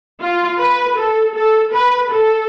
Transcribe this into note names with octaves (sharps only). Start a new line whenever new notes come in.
F4
B4
A4
A4
B4
A4